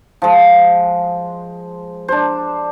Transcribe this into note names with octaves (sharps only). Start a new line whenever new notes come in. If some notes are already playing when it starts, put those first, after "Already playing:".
F3 G#3
D4 C5